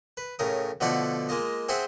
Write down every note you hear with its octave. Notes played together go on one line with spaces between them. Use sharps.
B4
A2 C#3 A#4 D#6
B2 D3 F3 A3 D5 F#5
G#3 A#3 F4 D#5
C4 G#4 C5 E5 F#5